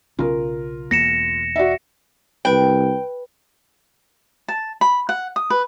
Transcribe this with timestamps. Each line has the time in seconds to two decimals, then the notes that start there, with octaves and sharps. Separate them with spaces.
0.19 B1 C#3 C#4 F4 A#4
0.91 E1 E2 A#3 A#6 C#7 E7
1.56 F#4 D5 E5
2.45 C2 B4 G5 B5
4.48 A5
4.81 B5
5.09 F#5
5.36 D#6
5.50 B4